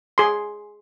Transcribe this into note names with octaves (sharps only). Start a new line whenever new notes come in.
G#4 C6